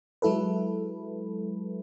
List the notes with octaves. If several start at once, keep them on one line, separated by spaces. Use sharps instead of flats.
F#3 G#3 E4 A4 B4